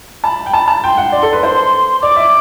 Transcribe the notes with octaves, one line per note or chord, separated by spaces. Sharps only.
A5 B5
G5
A5
A5
G5 C6
F#5
D5
A4
B4
C5 C6
D5 D6
E5